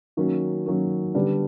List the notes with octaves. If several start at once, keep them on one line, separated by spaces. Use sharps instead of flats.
D#3 F#3 A#3 C#4
D#3 F#3 A#3 C#4
D3 G3 B3 D4 G4